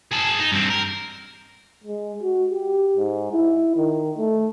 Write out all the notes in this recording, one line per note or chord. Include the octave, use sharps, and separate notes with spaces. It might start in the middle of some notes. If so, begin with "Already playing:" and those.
G#4 A5
D#4
G2 C4
A#4
G#3
F#4
G4
G#2
E4
D#3
A3